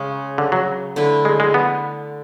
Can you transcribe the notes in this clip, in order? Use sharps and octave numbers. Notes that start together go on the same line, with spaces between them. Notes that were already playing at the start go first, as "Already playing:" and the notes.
Already playing: C#3 G#3 C#4
D3
F#3
D3 A3 E4 B4
G#3
G#3
B3